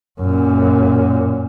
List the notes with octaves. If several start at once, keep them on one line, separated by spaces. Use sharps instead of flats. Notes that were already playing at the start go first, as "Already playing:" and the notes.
F#2 A#2